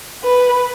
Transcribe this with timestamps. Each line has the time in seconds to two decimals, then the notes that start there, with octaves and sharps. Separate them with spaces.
0.23 B4